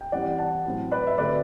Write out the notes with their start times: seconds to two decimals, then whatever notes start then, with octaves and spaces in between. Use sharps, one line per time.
0.01 G5
0.12 E3 G3 C4 D5 F#5
0.38 F#5 A5
0.66 A2 F#3 C4
0.92 B4 D5
1.07 E5
1.18 D3 A3 C4 F#4 B4 D5